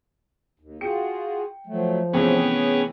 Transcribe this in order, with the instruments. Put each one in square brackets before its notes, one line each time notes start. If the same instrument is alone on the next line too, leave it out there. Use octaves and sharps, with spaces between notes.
[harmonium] D#2
[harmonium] F4 F#4 G#4 [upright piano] G5 C#7
[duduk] F3 [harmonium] F#3 A3
[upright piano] C3 E3 A3 [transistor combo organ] B3 C#4 [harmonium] G#4 C#5 G5